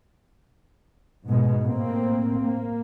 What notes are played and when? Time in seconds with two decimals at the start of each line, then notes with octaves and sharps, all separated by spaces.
1.26 G#2 B2 G#3
1.65 A2 A#3 C4
2.42 A#3